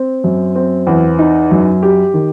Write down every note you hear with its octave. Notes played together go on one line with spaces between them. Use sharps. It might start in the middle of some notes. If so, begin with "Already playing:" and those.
Already playing: C4
F#2
C4
E2
D#4
F#2
G4
D#3